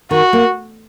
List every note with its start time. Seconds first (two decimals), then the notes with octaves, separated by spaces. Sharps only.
0.11 D#3 F#4
0.33 A#3